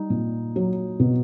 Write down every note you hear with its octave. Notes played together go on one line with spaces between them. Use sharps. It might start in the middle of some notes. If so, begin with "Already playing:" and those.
Already playing: G3 D#4
A#2
F#3
B2